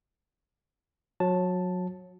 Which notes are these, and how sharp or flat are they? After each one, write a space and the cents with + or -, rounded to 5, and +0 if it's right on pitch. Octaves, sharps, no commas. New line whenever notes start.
F#3 -25 A5 +0